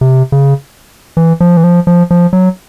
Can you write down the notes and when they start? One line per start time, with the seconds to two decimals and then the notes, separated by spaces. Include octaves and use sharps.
0.01 C3
0.32 C#3
1.17 E3
1.40 F3
1.57 E3
1.64 F3
1.87 F3
2.11 F3
2.33 F#3